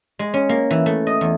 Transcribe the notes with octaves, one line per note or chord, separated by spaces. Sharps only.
G#3
C#4
A#3
E3
A3
D#5
E2